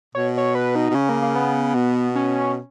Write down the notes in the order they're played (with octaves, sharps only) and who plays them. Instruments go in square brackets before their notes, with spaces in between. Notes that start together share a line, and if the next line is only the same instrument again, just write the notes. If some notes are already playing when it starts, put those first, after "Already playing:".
[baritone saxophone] B2 [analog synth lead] C#5
[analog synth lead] C#5
B4
D#4
[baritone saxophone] B2
[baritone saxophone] C#3 [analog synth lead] C#4
[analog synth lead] A#3
A#3
B3
[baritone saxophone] B2
[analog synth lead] C#4